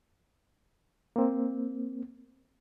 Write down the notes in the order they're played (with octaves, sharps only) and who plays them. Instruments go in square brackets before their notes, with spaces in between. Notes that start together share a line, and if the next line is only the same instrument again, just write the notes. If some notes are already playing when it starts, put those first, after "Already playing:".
[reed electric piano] A#3 C4